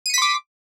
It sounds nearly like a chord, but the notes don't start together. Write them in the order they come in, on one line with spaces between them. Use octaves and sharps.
D#7 C#7 B6 C6 D6